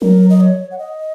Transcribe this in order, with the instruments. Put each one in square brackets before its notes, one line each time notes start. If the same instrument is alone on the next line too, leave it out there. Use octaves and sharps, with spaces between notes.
[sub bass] F#3 [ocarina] A#4
[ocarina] D#5
C#5
F#5
D#5